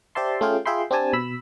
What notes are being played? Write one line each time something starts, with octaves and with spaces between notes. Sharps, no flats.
G4 C5 D5 E5 A5 C6
A3 C#4 F4 G#4 F5 G5
F4 G#4 E5 G5 B5 C6
C4 D4 G4 G#5 A5
B2 B5 E6